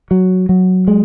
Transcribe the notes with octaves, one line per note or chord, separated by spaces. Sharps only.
F#3
F#3
G#3